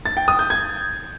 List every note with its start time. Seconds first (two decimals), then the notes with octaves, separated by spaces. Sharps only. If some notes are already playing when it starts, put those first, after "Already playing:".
0.06 A6
0.17 G5
0.28 D#6
0.39 G6
0.50 G#6